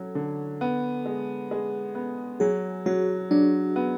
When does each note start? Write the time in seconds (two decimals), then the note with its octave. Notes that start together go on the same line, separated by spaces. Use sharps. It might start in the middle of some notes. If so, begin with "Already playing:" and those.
Already playing: F#3 C#4 A4
0.15 D3
0.61 B3
1.06 G#3
1.51 G#3
1.95 B3
2.40 F#3 G#4
2.86 F#3 F#4
3.31 F#3 D4
3.76 B3